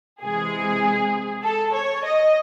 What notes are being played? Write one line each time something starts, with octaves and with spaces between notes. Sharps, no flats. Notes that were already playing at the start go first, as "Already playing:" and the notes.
C3 E3 G#3 G#4
A4
C#5
D#5